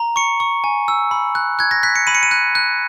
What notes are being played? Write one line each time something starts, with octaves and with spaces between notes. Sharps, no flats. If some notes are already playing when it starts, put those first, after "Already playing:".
Already playing: A#5
C#6 C#7
C#6
G#5
E6
B5
F#6
F#6 G#6
A#6
F#6 B6
C#7
B5 D#7
C#7
D#7
F#6
F#6